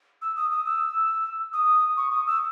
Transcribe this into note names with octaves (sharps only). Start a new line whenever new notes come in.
E6
D#6
D#6
E6
D#6
C#6
D#6
E6